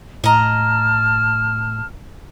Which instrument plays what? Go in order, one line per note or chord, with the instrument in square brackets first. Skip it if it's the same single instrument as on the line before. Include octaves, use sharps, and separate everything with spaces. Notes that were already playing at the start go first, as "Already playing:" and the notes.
[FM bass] A2 [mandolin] D#5 A#5 [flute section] A5 F6